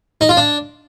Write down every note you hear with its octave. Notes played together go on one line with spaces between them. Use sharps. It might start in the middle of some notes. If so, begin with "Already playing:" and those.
D#4
F4
D4